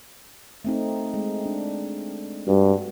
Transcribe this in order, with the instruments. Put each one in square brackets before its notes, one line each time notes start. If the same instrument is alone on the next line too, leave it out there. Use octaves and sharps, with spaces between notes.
[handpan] A3 C4 D#4
G#3
D4
[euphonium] G2 [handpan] F#4